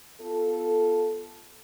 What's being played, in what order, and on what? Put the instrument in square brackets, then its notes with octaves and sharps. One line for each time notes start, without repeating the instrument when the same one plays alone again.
[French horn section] B3 F4 A4